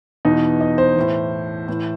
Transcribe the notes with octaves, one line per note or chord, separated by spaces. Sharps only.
E2 B2 D#4
D#5
C5
A2 E3
A2 E3